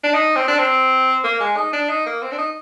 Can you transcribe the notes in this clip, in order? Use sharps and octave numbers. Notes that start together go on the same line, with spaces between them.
D4
D#4
C4
D4
C4
A#3
G#3
D#4
D4
D#4
A#3
C4
D4
D#4